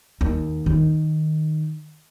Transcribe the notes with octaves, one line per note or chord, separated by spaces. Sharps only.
D#2
D#3